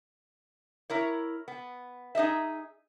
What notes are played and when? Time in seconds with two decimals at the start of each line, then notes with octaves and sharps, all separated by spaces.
0.90 E4 A#4 C#5
1.48 B3
2.15 D#4 G#4 D#5 E5